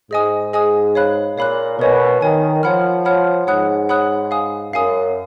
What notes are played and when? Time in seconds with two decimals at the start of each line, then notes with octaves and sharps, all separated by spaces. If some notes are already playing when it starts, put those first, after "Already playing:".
0.11 G#2 G#4 D#5 G#5 D#6
0.53 G#4 D#5 G#5 D#6
0.95 C#5 F5 B5 F#6
1.37 A#2 C#5 F5 B5 F#6
1.79 B2 A#4 C#5 G#5
2.21 D#3 A#4 C#5 G#5
2.63 F3 C#5 F#5 B5 F6
3.05 C#5 F#5 B5 F6
3.47 G#2 C#5 F#5 B5 D#6 F#6
3.89 C#5 F#5 B5 D#6 F#6
4.31 F5 G#5 D#6
4.73 F#2 F5 G#5 D#6